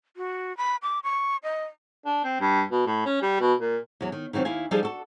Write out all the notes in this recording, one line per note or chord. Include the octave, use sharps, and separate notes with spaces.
F#4
B5
D6
C#6
D#5
D4
C4
G2
B2
A2
C#4
G3
B2
A#2
E2 F#3
D#3
D#3 E3 F#3 C4
D#2 E4 F5 G#5
F3 G3 D4 D#4 G#4 A4
F#4 A4